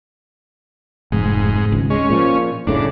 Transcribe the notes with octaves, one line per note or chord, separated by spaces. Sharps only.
F1 G#2
G#1 C#2
G#3 C#4
A#2 F3
F#1 A2 C#3 D4